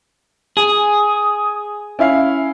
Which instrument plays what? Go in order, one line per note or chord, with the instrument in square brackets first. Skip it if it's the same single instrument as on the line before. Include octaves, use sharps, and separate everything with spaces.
[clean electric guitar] G#4 [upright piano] G#5 [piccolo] D#6
[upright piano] C#4 E4 F5 [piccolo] E5